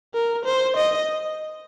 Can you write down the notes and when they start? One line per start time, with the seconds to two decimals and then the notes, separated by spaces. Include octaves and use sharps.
0.14 A#4
0.45 C5
0.77 D#5